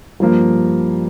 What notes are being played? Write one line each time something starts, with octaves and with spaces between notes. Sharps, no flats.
G2 F3 A#3